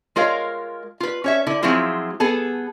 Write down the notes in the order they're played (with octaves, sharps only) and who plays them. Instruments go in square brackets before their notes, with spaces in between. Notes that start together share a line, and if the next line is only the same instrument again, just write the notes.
[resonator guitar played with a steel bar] G#3 F4 A#4 C#5 F5
F4 B4
C#4 C#5 E5
D3 E4 A4
F3 F#3 G#3 C4 E4 F4
B3 G#4 A4